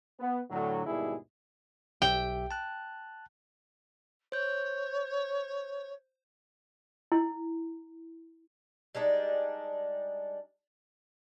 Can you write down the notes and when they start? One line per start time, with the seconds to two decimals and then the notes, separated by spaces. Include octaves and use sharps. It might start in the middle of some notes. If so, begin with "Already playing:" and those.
0.19 B3
0.51 A2 D3 F#3
0.86 D#2 G#2 B2 G3 E4 G#4
2.02 B1 G4 E5 G5
2.51 A5 F#6
4.32 C5 C#5 G6
7.12 E4
8.95 G3 G#3 D4 D#4